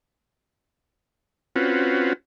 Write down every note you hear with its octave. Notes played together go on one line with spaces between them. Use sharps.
C4 C#4 F4 F#4 B4